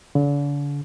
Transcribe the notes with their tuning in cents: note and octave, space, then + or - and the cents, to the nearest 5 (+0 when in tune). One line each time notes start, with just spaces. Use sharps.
D3 -40